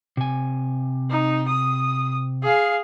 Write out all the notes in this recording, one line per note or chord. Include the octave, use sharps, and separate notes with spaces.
C3 G#5
D#4
D#6
G#4 F5